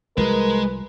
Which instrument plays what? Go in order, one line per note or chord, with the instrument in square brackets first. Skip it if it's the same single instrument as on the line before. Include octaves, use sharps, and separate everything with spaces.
[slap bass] C2 F3 G3 [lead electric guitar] G#3 [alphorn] A#4 [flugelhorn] B4